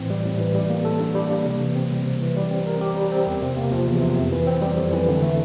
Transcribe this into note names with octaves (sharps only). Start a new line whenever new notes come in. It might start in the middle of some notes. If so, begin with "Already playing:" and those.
Already playing: A2 E3 C4
G3
A2
E3
G3
A#3
A4
D4
G3
A#3
C3
E3
C4
G3
C3
E3
G3
C4
A#4
G4
G3
C4
E2
C3
A#3
F3
E2
C3
F2
E3
C4
G3
F2
E3
D3
A3